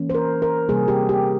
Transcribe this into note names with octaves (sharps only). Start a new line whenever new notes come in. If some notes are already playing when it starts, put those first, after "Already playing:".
Already playing: E3 A#3 C#4
C5
A#4
A#4
C3 G3 A#3 G#4
G4
G4